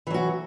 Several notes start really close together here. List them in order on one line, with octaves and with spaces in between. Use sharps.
E3 F#3 F#4